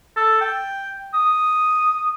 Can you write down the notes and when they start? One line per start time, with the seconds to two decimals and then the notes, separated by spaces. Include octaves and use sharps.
0.17 A4
0.41 G5
1.14 D#6